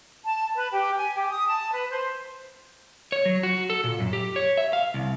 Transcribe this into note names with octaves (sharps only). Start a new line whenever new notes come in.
A5
B4
G4
G#5
G4
D#6
A5
B4
C5
C#5
F#3
F#4
A4
A#2
F#2
G4
C#5
E5
F5
C2